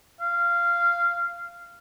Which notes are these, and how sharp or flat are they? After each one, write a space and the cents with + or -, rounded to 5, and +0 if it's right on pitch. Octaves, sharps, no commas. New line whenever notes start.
F5 -15